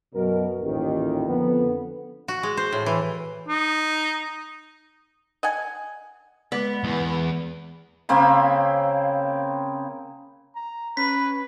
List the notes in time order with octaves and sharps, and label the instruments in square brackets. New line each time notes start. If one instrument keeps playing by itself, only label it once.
[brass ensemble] F#2 B2 A#4
A1 D#2 A#2 D#3
F2 D3 B3
[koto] F#4
G#3
C5
A2
E3
[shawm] D#4
[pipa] D#5 F#5 G#5
[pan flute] G#3 [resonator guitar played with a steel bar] B3 [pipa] D5
[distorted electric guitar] E2
[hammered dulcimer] C#3 A#3 C4 B5
[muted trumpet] A#5
[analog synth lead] C#4 [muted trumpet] B4 [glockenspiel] B6